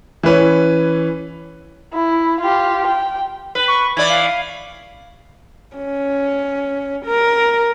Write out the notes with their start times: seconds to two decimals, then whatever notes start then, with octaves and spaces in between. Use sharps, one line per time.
0.23 E3 C#4 B4 C#5
1.93 E4
2.41 F4 G4
2.87 G5
3.55 B4
3.68 C#6
3.97 E3 D5 G#6
4.09 F5
5.77 C#4
7.05 A#4